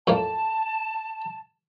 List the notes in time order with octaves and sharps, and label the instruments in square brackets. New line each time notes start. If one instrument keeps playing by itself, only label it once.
[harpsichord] F2 A2 A#3 [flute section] A5